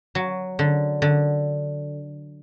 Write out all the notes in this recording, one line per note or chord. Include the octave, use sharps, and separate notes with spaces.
F#3
D3
D3